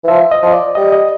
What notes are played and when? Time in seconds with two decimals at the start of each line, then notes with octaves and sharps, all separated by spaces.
0.04 E3
0.08 F3 E5
0.31 D#5
0.42 F3
0.53 D5
0.75 G3 D#5
0.92 D#5